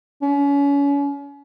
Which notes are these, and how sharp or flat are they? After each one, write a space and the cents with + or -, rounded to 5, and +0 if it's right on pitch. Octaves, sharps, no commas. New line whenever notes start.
C#4 +35